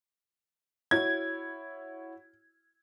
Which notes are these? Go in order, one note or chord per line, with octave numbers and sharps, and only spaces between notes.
E4 F#4 C#5 G#6